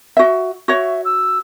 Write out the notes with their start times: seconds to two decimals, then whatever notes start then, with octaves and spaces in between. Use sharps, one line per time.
0.17 F#4 E5
0.68 F#4 C#5 E5
1.04 E6